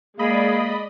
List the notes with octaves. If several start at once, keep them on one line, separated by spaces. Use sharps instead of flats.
G#3 A#3 G#4 D5 D#5 B5